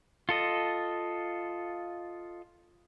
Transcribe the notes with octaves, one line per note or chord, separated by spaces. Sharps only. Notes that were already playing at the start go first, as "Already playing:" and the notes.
F4 A4 D#5